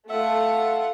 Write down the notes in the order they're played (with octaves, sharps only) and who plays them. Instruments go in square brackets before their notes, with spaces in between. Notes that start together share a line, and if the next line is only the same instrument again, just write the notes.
[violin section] A3 [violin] F4 F#5 [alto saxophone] E5